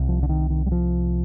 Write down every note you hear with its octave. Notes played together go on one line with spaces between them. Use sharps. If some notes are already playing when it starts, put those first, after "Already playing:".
Already playing: C2 C3
F3
D3
D#3
D#3
G3
F3